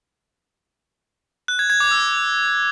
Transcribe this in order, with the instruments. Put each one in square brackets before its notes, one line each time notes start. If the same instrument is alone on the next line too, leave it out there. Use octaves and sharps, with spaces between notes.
[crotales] F#6
G#6
G#6
D6
E6